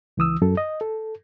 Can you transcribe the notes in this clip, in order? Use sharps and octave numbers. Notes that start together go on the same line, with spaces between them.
C#2 E3 D#6 E6
F#2 A4
D#5
A4